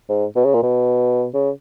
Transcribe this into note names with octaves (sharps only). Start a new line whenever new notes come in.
G#2
B2
C#3
A#2
B2
C#3